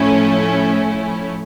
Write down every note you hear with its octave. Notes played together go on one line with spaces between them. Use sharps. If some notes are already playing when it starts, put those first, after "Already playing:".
Already playing: A2 F3 A3 C#4 E4